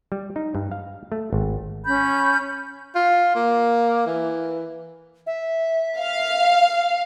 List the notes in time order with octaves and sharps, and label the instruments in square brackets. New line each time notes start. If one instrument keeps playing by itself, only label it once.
[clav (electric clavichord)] G3
D#4
G2
F5
A3
G#1
[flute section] C#4 B5 G6
[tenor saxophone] F4
A#3
E3
[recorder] E5
[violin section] F5